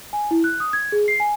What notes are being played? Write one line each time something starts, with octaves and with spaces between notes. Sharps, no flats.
G#5
E4
F#6
D#6
G#6
G#4
C7
G#5